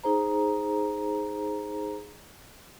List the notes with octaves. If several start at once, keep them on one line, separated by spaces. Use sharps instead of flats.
D#4 G#4 C5 A#5